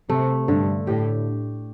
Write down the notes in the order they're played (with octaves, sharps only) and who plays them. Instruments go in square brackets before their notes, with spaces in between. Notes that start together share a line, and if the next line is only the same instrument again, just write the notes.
[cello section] C3 [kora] A3
[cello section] G2 [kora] D3
[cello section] A2 [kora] G4